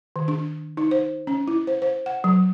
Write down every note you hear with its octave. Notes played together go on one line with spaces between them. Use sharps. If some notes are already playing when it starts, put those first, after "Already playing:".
D#3
D4
D#4
C5
C#4
E4
C5
C5
F#5
F#3